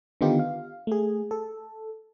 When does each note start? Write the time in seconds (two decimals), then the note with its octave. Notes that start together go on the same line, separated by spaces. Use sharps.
0.21 D3 D#3 B3 D#4 F4 G4
0.39 F5
0.87 A3 G#4
1.31 A4